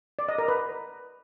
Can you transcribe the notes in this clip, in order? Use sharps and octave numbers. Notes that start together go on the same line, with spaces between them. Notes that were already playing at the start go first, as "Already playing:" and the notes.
D5
D#5
A#4
B4